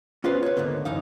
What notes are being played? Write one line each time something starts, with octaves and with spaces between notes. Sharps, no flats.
B3 C#4 F4 G#4 B4 C5
B4 C#5
D2 G#2 D3 A#3 B3
F#2 E3 D#4 F5